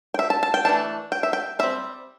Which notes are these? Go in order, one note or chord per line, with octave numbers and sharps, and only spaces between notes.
G5
E5
A5
A5
G5
E3 A3 D4 A5
G5
E5
G5
G3 C4 E5